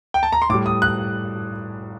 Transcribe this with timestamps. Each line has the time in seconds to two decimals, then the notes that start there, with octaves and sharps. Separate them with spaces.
0.14 G5
0.23 A5
0.32 A#5
0.42 C6
0.49 A2 D6
0.54 G3
0.66 D#6
0.82 F#6